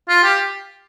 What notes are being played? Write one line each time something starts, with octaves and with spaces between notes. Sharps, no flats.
F4
G4